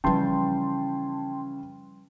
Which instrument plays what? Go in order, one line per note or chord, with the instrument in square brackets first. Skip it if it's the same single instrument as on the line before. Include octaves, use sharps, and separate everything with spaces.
[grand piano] C#3 E3 [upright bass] F3 G3 [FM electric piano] G5 A5 C6